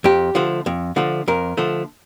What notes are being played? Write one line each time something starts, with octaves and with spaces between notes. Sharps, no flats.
F2 G4
D3 F3 A3
F2
D3 F3 A3
F2 A#4
D3 F3 A3